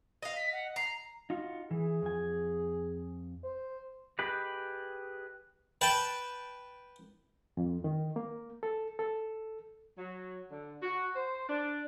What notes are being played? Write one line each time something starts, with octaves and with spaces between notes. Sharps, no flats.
D#5 F5
B6
F#5
A#5 C7
D#4 F4 F#4
E3 G#4
F2 G#5
C5
G4 G#4 B4 D#5
B4 G5 A5
F2
D#3
A#3
A4
A4
F#3
D3
F#4
C5
D4